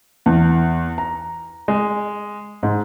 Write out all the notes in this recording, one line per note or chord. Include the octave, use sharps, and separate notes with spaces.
E2
A#5
G#3
G#2